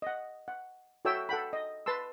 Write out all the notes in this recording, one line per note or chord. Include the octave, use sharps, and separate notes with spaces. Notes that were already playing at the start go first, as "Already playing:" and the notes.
D#5 F#5
F#5
F#4 A4 C#5 E5 G5 E6
A4 F#5 G5 B5
D#5
B4 A5 C6 E6